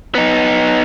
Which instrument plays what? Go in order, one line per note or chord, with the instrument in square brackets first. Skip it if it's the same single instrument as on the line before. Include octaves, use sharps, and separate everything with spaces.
[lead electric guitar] B3 D#4